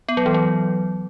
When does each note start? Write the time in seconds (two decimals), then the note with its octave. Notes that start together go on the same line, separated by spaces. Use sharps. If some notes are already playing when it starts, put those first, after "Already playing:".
0.09 B3
0.17 F#3
0.26 E3
0.34 F#3